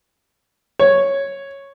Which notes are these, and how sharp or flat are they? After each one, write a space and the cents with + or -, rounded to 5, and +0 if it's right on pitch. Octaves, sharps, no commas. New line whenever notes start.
C#5 -5